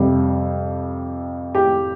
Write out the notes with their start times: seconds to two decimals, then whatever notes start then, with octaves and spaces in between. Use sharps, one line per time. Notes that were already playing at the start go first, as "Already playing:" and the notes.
Already playing: F2 C3 G3 G4
1.55 G4